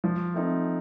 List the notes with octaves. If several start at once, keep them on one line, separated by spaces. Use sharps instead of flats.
F3
A3 C4 D#4